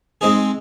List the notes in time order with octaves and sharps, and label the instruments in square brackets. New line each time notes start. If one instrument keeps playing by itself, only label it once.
[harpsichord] G#3 C4 D#4 G#4